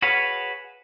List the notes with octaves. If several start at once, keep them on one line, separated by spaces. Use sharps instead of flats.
F#4 G#4 B4 C#5 F5